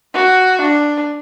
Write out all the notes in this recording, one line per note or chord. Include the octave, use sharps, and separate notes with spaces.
F#4
D4